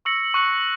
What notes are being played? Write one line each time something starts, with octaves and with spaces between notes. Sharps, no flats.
C#6 E6 A#6 C#7 F#7
C#6 F#6 C#7 F#7